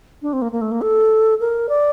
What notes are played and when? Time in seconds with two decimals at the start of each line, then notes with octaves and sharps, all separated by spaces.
0.22 D4
0.33 C4
0.42 A#3
0.52 A#3
0.61 A3
0.71 A#3
0.82 A4
1.40 A#4
1.69 D5